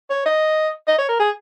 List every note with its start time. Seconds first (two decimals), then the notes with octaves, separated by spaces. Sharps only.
0.10 C#5
0.26 D#5
0.87 D#5
0.98 C#5
1.09 A#4
1.19 G#4